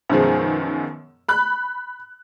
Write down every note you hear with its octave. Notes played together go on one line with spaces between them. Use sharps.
F#2 B2 D#3 F3 G#3
B5 F#6